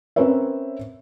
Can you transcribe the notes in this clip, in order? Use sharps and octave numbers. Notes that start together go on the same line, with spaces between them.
C4 C#4 A#4 B4 C#5 E5